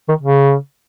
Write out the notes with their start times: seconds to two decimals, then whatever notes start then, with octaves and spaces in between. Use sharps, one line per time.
0.09 D#3
0.21 C#3